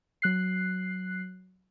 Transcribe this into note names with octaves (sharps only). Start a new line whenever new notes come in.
F#3 F#6 C7